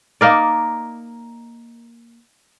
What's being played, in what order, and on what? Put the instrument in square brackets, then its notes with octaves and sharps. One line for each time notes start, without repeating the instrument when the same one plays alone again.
[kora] A#3 D#4 A#4 D5